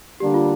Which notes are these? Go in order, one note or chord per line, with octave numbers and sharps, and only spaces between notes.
D3 G3 A#3 D4 G4
F4